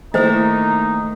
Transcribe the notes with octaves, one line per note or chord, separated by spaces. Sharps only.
D#3 A3 A#3 D#4 E4 C5 D#5